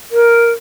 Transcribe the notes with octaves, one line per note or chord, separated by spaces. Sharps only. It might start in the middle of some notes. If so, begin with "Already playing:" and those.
A#4